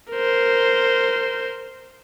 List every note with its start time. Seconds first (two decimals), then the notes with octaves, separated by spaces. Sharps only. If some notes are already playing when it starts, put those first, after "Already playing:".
0.11 A#4 C5